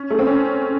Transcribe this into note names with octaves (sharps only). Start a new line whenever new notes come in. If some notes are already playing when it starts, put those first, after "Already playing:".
Already playing: C#4
A3
C4
C#4